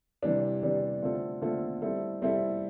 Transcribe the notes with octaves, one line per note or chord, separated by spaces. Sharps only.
C3 E3 G3 D4
C3 E3 G3 D4
D3 A3 C4 F4 A4
D3 A3 C4 F4 A4
G3 C4 E4 A4
G3 C4 E4 A4